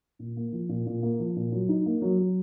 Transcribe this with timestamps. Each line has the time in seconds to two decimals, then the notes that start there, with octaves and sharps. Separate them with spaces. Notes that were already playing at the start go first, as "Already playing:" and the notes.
0.19 A#2
0.37 A#3
0.52 F3
0.69 A#2
0.87 A#2
1.03 A#3
1.19 F3
1.36 A#2
1.52 F#3
1.69 D#4
1.86 A#3
2.02 F#3
2.18 F#3